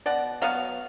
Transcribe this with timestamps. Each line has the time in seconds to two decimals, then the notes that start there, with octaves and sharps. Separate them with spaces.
0.06 B2 D5 F#5
0.42 F#3 B3 C#5 F5